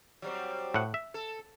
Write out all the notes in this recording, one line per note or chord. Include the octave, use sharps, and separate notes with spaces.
F#3 G3 C4
A2 F#5
E5
A4